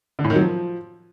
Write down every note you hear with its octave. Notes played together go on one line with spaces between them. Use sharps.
D3
A2
D#3
F#3
F3